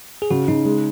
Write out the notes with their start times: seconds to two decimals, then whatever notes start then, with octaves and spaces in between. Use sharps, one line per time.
0.22 G#4
0.31 C#3 F#4
0.48 C#3 D#4
0.65 G#3